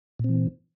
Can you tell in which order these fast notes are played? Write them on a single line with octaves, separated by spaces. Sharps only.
A#2 C4 E3